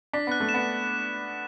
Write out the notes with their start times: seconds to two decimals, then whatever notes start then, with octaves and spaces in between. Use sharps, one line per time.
0.13 D4 B6
0.27 B3 F#6
0.40 A3
0.49 E7
0.54 B3